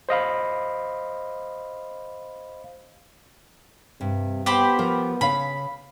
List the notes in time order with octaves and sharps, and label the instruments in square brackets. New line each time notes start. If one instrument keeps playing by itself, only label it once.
[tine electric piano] C5 D#5 F5 B5
[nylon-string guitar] G2 [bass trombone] C3
[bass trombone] B3 [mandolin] G4 C5 B5
[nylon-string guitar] F3 A#4
[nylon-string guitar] C#3 F5 [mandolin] B5